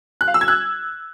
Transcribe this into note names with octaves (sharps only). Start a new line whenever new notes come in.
F#6
F5
E6
G#6
F#6